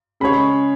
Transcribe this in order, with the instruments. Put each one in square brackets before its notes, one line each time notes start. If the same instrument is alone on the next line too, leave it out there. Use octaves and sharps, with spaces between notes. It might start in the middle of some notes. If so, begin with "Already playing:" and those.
[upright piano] C#3 G#3 C#4 G#4 C#5 [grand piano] B5